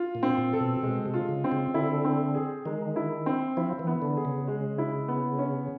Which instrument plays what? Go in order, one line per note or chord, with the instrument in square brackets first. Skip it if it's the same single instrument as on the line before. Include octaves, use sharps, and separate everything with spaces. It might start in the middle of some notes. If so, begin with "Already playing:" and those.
Already playing: [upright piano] F4
[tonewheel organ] A#2
[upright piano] C4
[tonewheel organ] A#2
[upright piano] A4
[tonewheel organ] B2
[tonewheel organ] B2 [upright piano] G#3
[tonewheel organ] C3
[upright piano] F4
[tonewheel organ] C#3
[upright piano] C4
[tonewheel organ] C#3
[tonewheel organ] D3 [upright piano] E4
[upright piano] C4
G#4
[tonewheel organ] D#3 [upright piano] G#3
[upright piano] E4
C4
[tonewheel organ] F3 [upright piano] E4
[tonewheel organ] E3
[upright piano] B3
[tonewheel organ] D3
[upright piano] G#4
[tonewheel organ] C#3
[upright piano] G#3
E4
B3
C#4